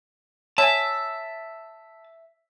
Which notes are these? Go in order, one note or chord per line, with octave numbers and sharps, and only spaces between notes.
C#5 E5 G#5 A5